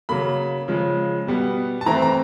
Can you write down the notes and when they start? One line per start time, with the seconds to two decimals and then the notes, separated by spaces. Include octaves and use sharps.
0.09 C#3 F#3 A#3 B5
0.68 C#3 F3 G#3
1.27 B2 G3 B3
1.81 A5
1.86 E3 A3 C4 A#5
2.02 A#5